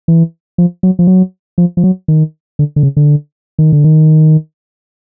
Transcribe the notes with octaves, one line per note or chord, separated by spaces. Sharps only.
E3
F3
F#3
F3
F#3
F3
F3
F#3
D#3
D3
D3
C#3
D3
D#3
D3
D#3